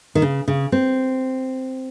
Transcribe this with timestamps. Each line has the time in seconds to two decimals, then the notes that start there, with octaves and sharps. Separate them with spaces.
0.15 D#3
0.22 C#3
0.48 C#3
0.72 C4